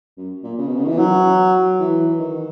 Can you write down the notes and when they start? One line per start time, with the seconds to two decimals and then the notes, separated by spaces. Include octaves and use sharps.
0.18 F#2
0.44 A#2
0.58 C#3
0.68 B2
0.78 C#3
0.84 D#3
0.88 E3
0.99 F#3
1.80 E3
2.20 D#3